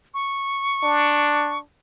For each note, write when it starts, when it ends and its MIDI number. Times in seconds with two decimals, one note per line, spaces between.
0.14 1.58 85
0.83 1.62 62